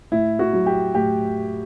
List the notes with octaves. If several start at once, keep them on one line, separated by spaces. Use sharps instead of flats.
A2 E4
F#4
F#3
G4
A2 G4